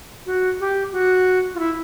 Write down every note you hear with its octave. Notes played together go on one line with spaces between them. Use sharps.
F#4
G4
F#4
F4
E4